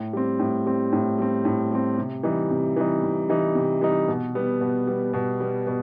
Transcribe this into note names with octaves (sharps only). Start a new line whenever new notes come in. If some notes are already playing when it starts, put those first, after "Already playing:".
Already playing: A2
G3 C4
A2
G3 C4
A2
G3 C4
A2
G3 C4
C3
E3 G3 D#4
C3
E3 G3 D#4
C3
E3 G3 D#4
C3
E3 G3 D#4
B2
G3 B3
B2
G3 B3
B2
G3 B3
B2